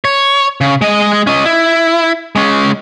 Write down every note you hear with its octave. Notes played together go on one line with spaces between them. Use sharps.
C#5
C#3
G#3 D#5
C#4 D#5
E4
G#3 C#4